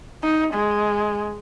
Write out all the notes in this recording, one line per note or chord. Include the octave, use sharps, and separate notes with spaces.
D#4
G#3